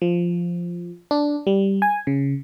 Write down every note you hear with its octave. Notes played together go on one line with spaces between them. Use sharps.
F3
D4
G3
G#5
C#3